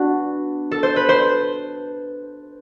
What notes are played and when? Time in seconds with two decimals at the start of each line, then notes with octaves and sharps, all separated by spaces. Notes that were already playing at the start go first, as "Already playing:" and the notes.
Already playing: B3 D4 F#4
0.71 A4
0.83 C5
0.96 B4
1.09 C5